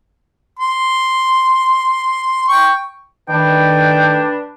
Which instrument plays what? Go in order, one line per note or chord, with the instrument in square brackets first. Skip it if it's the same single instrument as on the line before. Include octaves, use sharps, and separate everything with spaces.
[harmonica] C6
G5 C#6
[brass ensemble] D#3 A3 D5 [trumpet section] D4 B4 [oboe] G5